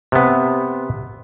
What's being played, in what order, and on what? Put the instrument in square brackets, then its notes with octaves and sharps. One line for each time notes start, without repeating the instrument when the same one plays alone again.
[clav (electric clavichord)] C3 B3